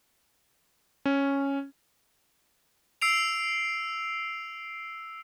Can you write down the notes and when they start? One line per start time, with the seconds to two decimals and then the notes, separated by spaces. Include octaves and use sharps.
1.05 C#4
3.02 E6 C7 D7 F7